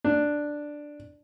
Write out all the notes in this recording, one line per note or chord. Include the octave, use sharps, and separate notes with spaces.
D4